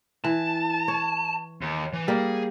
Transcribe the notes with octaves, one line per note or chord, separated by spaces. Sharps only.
E3 A5
C#5
D#2
E3
G3 A#3 G#4